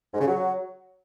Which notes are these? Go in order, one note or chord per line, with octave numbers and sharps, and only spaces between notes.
G#2
C#3
F#3